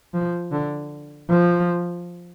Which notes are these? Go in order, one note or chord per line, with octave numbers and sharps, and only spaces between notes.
F3
D3
F3